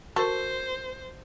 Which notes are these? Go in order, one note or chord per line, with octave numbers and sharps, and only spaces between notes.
F#4 A4 A#4 C5 C#6